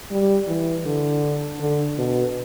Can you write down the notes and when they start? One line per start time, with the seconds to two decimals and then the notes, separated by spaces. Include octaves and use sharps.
0.11 G3
0.47 E3
0.86 D3
1.60 D3
1.98 B2